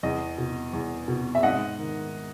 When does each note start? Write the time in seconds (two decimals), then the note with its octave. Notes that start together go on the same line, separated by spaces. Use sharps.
0.03 E2 D#5
0.38 B2
0.73 E2
1.08 B2
1.35 E5
1.43 G#2 D#5 F#5
1.78 D#3